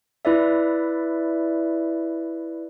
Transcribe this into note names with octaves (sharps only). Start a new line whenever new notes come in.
E4 B4 D5 E5